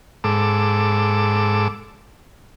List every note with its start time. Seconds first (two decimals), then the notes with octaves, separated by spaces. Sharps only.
0.24 G#2 A4 D6 E6